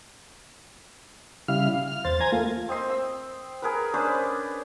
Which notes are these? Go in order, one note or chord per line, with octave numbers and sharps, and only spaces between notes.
C#3 G3 E4 F5 F6
F5
F6
E2 C5 A6
C5 G#5 A#5 G#6
A3 A#3 F4
C4 D#5 C6
E6
G#4 A#4 B4
C#4 D4 B4 C5